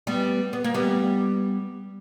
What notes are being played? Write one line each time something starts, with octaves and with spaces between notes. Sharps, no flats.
G3 B3
B3
A#3
G3 B3